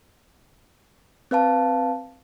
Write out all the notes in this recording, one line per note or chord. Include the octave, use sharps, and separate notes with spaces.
C4 B4 F5 A5